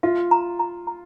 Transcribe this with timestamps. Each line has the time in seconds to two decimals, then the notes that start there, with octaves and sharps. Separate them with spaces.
0.03 F4 E5
0.31 A#5
0.59 A#5
0.87 A#5